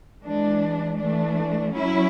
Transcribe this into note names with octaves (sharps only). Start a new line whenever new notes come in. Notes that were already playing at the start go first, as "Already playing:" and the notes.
E3 G#3 D4
E3 A3 D4
F#3 C#4 E4